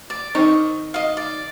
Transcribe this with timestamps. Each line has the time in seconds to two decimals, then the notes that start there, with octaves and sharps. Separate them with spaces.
0.10 D5
0.35 D#3 C4 D#4 C#6
0.94 D#5 F5
1.17 D5